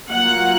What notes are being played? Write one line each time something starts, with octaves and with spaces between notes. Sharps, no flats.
F#3 A#3 F4 F#5